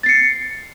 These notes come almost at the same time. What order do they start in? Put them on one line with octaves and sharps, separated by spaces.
A6 C7 C#7